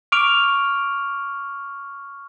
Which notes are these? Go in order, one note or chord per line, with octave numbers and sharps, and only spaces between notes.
C#6 D6 F6 D7 F7